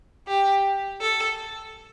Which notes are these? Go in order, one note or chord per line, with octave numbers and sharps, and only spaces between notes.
G4
A4